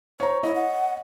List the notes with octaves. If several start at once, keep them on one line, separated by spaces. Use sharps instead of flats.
C5 C#5 A#5
E4 C#5 D#5
F#5